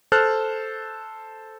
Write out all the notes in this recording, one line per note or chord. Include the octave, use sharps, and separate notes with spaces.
A4 C5 A5 F6 F#6